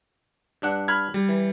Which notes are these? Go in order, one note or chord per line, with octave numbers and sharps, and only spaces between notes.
G2 D4 F#5
B5 F6 G#6
G3
E3